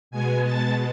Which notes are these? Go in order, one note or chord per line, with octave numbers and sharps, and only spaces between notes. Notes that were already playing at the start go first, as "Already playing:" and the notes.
B2 G#3 B3 G#5 G#6
A5 A6